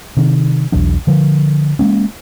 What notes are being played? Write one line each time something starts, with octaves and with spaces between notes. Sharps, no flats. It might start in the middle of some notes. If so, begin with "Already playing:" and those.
C3 D#3
B1 E2 F#3 D4
D3 F3
G#3 A#3 C#4